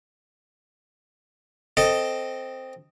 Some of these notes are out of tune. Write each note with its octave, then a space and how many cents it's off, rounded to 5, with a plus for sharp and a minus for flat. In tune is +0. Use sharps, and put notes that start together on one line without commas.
C4 +0 A4 +10 D#5 +0